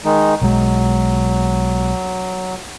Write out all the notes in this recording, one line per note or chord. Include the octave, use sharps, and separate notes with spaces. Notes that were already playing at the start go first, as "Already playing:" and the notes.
D#3 G#3 D#4
B1 F#3 G#3